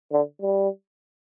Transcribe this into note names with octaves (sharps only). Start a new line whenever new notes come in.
D3
G3